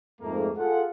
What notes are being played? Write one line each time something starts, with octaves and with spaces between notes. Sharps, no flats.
F2 G#2 A3 A#3
F4 G#4 A4 F#5